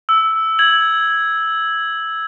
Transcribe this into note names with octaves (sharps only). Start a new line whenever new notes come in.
E6
G#6 F#7